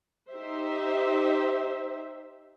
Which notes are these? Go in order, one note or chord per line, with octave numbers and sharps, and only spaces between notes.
D#4 G4 C5 E5